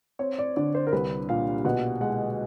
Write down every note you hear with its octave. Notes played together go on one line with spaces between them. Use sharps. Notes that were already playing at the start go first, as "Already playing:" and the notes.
C4 C#5
D5
D3 D5
C5
A#4
C2 B4
A#2 F5
B2 F#5
G#3 F#5